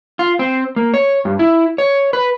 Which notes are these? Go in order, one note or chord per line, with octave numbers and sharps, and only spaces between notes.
F4
C4
A#3
C#5
G2
E4
C#5
B4